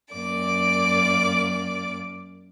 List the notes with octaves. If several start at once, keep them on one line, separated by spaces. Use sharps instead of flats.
F#2 A#3 D5 D6